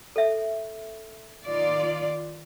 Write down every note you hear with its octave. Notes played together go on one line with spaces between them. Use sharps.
A4 E5
D#3 F4 D5